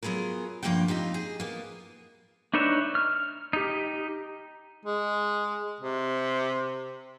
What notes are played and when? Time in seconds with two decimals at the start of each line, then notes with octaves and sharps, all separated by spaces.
0.03 F#3 B3 F4 G#4 A#4
0.63 G2 F3 A#3 D#4 F#5 G5
0.88 C4 D#4 F4 G4
1.14 G#4
1.40 A#3 B3
2.53 D4 D#4 B4 C#5 E5
2.95 F6
3.53 D#4 G4
4.86 G#3
5.81 C3